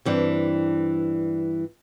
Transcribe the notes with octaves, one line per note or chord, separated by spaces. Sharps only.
G2 E3 C4 D4